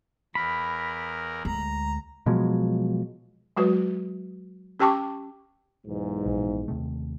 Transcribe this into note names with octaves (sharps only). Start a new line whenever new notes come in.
E2 A#4 B5
D2 G#3 A#5
B2 F3 F#3 G#3
F#3 G#3 F#4 B4
C#4 G4 G5 A5 C#6 D6
B1 E2 G#2
A#1
D#2 C3 A3